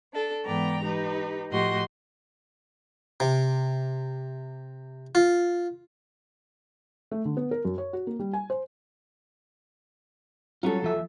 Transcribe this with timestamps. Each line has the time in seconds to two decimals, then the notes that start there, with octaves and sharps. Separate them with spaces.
0.13 D4 A4
0.45 G#2 E3 B3 D5 G5 A#5
0.82 D#4 G4 B4
1.51 A2 F3 F#4 G4 D#5 C6
3.20 C3
5.15 F4
7.11 A3
7.25 D3
7.37 B3
7.51 A#4
7.65 F#2
7.78 C#5
7.93 F#4
8.07 A#3
8.19 G3
8.33 G#5
8.50 C5
10.63 F#3 G3 C#4 F4 A4
10.82 D#2 F3 E5